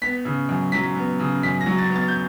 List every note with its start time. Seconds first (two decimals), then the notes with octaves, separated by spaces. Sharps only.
0.02 B3 B6
0.25 C#3
0.49 F#2
0.72 F#3 B6
0.96 B3
1.20 C#3
1.43 F#2 B6
1.61 A#6
1.66 F#3
1.78 A6
1.90 B3
1.96 A6
2.08 G6